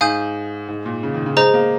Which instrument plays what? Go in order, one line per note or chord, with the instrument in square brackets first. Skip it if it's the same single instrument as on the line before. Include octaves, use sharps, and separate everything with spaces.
[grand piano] G#2 [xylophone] F5 G#5 D#6 G6
[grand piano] G#2
A#2
C#3
D#3
C#3
[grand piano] G#3 [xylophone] G#4 C5 D#5 A#5
[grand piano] A#3